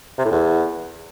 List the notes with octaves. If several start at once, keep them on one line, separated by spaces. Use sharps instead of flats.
C3
A2
E2